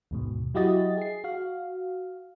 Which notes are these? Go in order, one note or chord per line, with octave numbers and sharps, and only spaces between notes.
D#2 G#2 B2
F#3 E4 F#4 G4 D#5 A6
G#4 C7
F#4 F5